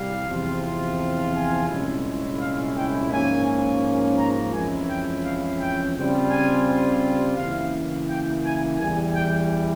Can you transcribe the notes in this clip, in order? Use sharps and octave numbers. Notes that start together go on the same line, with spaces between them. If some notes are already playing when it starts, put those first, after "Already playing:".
Already playing: C2 G3 F5
E2 C3 F3 C4 F4
G#5
C2 A#2 G#3 C#4 E4
F5
G5
G#2 F3 A#3 C#4 G#5
A#5
F2 E3 G#3 C#4 E4 G#5
G5
F5
G5
C#3 G3 C4 F4
G#5
C#3 E3 A#3 E4 F5
G5
G#5
E2 E3 G3 G#5
G5